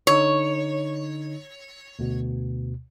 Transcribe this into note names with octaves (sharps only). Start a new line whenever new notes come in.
D3 D#4 C#5
D2 B2